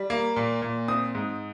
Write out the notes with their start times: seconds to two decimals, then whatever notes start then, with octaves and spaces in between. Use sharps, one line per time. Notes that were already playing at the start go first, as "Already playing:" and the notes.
Already playing: G3
0.10 A#3
0.36 A#2
0.62 A#2
0.88 C4 D#6
1.15 G#2